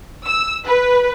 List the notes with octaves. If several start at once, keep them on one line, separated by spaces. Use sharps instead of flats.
E6
B4